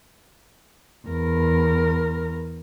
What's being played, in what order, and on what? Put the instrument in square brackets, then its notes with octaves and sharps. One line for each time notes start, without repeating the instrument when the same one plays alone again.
[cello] E2 A#4